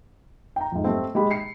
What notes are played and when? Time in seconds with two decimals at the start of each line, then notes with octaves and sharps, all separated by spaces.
0.56 G5 A#5
0.72 F2 G#2
0.84 G3 A3 C4
1.15 G#3 G4 B5
1.31 C7 C#7